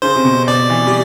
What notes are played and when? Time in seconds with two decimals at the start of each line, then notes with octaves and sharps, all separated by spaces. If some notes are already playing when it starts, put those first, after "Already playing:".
0.02 C#3 C5
0.16 C3
0.25 B2
0.47 B2 D5
0.70 E3
0.87 G3